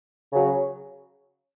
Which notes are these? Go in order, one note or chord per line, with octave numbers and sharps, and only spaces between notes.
C#3 F#3